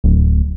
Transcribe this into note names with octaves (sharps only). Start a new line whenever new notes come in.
D1